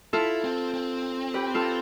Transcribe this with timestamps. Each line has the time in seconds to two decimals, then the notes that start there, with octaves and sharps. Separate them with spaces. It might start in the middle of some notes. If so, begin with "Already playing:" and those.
0.13 E4 F4 A4
0.44 C4
0.74 C4
1.34 G4 B4
1.54 F4 A4